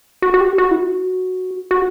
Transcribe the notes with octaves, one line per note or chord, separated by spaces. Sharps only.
F#4
F#4
G4
F#4
E4
F#4
F#4